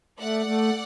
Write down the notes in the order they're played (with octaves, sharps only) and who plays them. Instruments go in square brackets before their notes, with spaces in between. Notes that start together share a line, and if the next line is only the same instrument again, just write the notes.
[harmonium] A3 [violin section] D5 F#5
[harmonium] A3